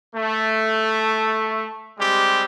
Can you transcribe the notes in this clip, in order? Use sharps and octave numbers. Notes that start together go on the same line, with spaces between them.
A3
G3 G#3 C4 G4